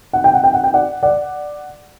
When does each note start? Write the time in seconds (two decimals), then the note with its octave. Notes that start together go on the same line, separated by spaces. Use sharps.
0.13 F#5
0.24 G5
0.34 F#5
0.44 G5
0.54 F#5
0.64 G5
0.74 D5 F#5
1.03 D5 F#5